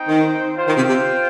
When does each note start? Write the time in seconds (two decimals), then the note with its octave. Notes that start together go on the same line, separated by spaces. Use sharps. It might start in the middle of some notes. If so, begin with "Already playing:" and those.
Already playing: C4 D#4 C5 G5
0.08 D#3
0.57 F4 C5 G5
0.67 D#3
0.77 C3
0.88 C3